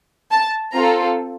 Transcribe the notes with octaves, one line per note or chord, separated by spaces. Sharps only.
A5
C4 F4 A4 A#5